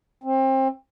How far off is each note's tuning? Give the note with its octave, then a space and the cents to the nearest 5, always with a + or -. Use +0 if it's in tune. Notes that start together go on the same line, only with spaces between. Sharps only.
C4 +25